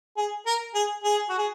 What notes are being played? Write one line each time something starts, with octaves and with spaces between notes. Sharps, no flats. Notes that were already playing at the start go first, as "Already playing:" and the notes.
G#4
A#4
G#4
G#4
F#4
G#4